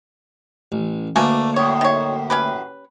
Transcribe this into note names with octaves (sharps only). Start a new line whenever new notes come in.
A1
D2 B2 A3 A#3 D4 G#5
F#2 A2 C#5
D#3 C#5
C#4 G4 B4